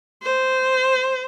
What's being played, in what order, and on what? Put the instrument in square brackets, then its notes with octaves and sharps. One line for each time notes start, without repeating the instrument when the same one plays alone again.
[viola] C5